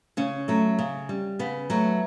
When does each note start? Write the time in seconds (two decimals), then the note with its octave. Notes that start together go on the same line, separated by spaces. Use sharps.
0.17 C#3 C#4
0.48 F#3 A3
0.79 C#3
1.09 G3
1.39 C#3 B3
1.70 F#3 A3